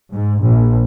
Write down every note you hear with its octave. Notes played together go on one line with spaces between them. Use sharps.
G#2
A#1